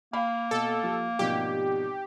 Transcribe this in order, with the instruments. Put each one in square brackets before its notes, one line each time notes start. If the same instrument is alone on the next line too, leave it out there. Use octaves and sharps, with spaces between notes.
[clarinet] A#3 [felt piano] F5 G5 B5
[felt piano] B2 [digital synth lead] A4
[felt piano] F3 G4
[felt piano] G#1 B2 F3 [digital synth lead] G4